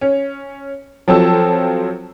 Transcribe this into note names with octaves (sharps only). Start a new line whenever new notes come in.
C#4
F3 F#3 C4 A4 A5 E6